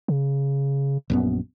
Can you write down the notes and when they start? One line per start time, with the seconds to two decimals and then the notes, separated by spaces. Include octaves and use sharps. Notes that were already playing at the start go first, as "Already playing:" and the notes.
0.08 C#3
1.10 A#1 F#2 B3